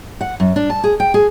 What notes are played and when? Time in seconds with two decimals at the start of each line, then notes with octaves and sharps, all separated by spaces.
0.21 F#5
0.40 F#2
0.56 D4
0.70 A5
0.84 G#4
1.00 G5
1.14 G#4